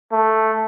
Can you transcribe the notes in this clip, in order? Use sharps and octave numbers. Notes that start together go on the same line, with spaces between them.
A3